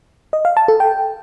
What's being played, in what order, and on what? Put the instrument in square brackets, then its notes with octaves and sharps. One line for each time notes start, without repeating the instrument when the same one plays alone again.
[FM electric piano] D#5
F5
A5
A4
G5